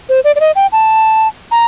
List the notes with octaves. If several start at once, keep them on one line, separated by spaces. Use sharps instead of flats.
C5
D5
D5
D#5
G5
A5
A#5